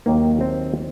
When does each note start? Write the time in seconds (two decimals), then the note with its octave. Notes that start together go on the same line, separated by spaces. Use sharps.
0.06 D#2 D#3 F#3 A#3
0.41 C4